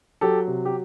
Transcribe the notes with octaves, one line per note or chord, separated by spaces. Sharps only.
F#3 G4 A4
C3
G4